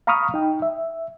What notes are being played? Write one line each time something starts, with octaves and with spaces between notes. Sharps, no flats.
F5 A#5 B5 C#6 D#6 F6
D#4 G5
E5